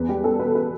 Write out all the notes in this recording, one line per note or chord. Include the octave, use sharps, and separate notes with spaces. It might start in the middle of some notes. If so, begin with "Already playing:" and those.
Already playing: E2 B4
G3 G4
G3 A4
B2 B4
B4